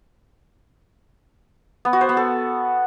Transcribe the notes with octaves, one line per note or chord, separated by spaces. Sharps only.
B3
F#4
C5
B3
A4